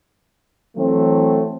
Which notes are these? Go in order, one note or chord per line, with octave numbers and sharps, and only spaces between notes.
E3 F#3 A3 C4